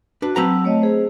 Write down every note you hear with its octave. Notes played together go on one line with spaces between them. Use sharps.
D4 F#4 B4
F#3 C4 B4 A5 A#5 E6
A3 C#5 D#5
G#4 C5